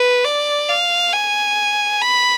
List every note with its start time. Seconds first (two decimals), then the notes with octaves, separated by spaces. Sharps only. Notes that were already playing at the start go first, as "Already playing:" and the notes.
Already playing: B4
0.24 D5
0.69 F5
1.13 G#5
2.02 B5